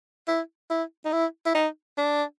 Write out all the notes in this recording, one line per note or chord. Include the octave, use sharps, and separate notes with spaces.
E4
E4
D#4
E4
E4
D#4
D4